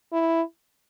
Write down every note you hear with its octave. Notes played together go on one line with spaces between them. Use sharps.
E4